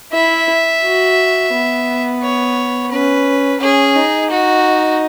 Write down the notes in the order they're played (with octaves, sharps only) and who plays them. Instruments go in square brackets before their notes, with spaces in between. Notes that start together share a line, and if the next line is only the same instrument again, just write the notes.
[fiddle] E4 [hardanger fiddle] E5
[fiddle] F#4
B3
[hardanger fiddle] C#5
[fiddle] C#4 [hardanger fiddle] B4
[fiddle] C#4 [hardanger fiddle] G#4
[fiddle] D#4
[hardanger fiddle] F#4